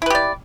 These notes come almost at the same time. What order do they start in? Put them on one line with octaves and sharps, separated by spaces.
E4 B4 G4 D5